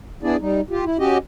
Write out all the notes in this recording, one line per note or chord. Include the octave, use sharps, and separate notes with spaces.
B3 D4 E4 G#4 D5
G3 D#4
F4 G4
E4
C#4 F#4 G4 D#5